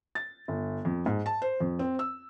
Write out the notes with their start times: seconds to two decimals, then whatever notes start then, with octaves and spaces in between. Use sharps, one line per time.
0.15 A6
0.48 G1
0.85 F2
1.06 G#2
1.26 A5
1.42 C5
1.60 F2
1.79 C4
1.99 E6